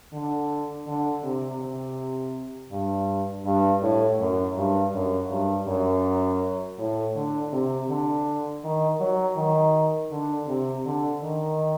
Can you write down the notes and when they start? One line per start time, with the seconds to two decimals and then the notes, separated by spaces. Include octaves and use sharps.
0.13 D3
0.87 D3
1.24 C3
1.60 C3
2.71 G2
3.45 G2
3.82 A2
4.20 F#2
4.57 G2
4.94 F#2
5.31 G2
5.67 F#2
6.79 A2
7.16 D3
7.53 C3
7.89 D3
8.64 D#3
9.00 F#3
9.37 D#3
10.11 D3
10.48 C3
10.85 D3
11.23 D#3